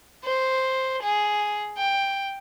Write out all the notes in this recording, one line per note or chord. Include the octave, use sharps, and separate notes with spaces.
C5
G#4
G5